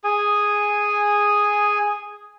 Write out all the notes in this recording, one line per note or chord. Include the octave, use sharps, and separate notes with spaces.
G#4 G#5